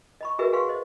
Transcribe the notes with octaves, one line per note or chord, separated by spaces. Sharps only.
D#5 B5 C#6
F#4 G#4 A#4 B4 D#5 E5
G#4 B4 F5 F#5 C6 C#6
C5 D#5